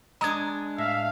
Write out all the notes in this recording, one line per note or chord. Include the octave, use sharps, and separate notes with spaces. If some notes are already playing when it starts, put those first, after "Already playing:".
G#3 D4 A#5 D#6 G#6
A2 E5 F5